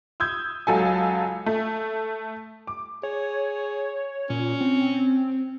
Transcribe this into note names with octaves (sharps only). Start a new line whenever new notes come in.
D#6 E6 G6 G#6
C#2 F#3 A4 G#5
A3
D6
G#4 C#5
A#2 C#4
C4